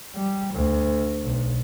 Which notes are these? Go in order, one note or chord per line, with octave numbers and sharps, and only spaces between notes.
G3
D2
B1